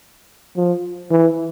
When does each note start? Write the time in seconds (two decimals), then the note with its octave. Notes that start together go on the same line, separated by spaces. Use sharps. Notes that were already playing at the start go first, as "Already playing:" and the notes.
0.56 F3
1.11 E3